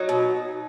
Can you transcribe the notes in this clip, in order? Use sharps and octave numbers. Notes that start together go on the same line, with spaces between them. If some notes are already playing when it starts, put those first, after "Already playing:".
Already playing: F#3 D#4
B2